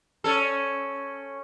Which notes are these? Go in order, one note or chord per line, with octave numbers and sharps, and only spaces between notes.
C#4 A4